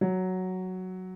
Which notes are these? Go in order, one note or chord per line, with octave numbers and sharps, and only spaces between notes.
F#3